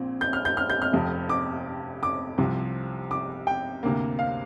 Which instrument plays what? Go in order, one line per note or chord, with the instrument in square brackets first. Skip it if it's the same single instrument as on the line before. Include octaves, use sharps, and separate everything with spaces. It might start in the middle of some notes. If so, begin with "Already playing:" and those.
Already playing: [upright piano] A#1 A#2 C4
G6
F6
G6
F6
G6
F6
F1 F2 C3
D6
D6
C2 C3 F3
D6
G5
D2 C3 A#3
F5